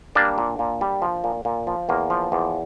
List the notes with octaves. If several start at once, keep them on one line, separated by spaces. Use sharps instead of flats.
G3 A#3 D4
A#2
A#2
G3
F3
A#2
A#2
F3
E2 A#3
F3
E2